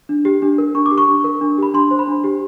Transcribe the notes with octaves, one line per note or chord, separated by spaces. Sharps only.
D4
G4
D4
A#4
D4 C#6
D6
G4
C#6
D4
A#4
D4
G4 B5
D4 C6
C5
B5
D4
G4